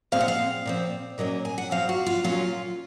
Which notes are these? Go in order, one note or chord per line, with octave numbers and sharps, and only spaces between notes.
A#2 F3 G#3 C4 F5
F#5
F5
A#2 F3 C4
A#2 F#3 A#3 C#4 D#5
G#5
F#5
A#2 F#3 C4 F5
F#4
F4
A#2 F#3 C#4 F4